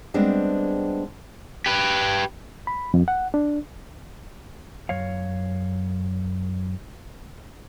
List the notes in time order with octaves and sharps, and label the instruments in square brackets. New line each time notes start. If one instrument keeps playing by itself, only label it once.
[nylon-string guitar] G3 G#3 B3 C4 D4 G#4
[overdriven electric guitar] G4 B4
[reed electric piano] B5
F2
F#5
D4
[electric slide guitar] F#2 C#5 F5